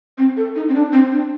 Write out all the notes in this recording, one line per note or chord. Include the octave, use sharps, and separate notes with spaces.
C4
A4
D#4
C4
D4
C4
D4